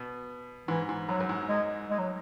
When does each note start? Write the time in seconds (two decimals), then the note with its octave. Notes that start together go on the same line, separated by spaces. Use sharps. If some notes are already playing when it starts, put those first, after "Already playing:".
Already playing: B2
0.68 G#2 E3
0.89 G#2
1.09 F#2 F#3
1.20 F#2
1.29 G#2
1.49 G#3
1.90 G#3
1.99 F#3